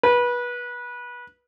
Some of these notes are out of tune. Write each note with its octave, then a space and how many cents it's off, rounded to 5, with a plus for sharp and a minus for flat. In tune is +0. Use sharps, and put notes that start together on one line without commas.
B4 -25